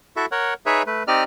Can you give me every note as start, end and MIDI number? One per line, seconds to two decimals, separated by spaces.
0.16 0.26 64
0.16 0.26 66
0.16 0.26 69
0.16 0.26 76
0.32 0.54 70
0.32 0.54 73
0.32 0.54 78
0.66 0.83 63
0.66 0.83 68
0.66 0.83 71
0.66 0.83 73
0.66 0.83 76
0.87 1.03 57
0.87 1.03 71
1.08 1.24 60
1.08 1.24 63
1.08 1.24 67
1.08 1.24 74
1.08 1.24 75
1.08 1.24 89